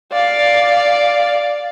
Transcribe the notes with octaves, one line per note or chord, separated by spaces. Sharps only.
D5 F5